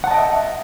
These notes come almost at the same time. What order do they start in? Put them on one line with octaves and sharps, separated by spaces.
F#5 A5 D#5 G5 E5